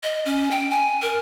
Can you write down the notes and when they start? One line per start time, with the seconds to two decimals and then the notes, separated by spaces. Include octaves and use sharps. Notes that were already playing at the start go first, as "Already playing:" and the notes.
0.03 D#5
0.25 C#4
0.51 G5
0.71 G#5
1.02 A#4